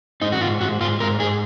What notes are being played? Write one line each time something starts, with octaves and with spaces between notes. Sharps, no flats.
G#2 D#4
F#4
G#2 F4
G#2 F#4
G#2 F4
G#2 A#4
G#2 G#4